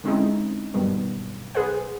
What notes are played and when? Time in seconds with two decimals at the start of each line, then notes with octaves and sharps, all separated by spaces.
0.04 D3 G#3 C4 C#4 D#4 E4
0.74 G2 B2 D#3 F#3 G3 B3
1.55 B1 G#4 B4 C5 F#5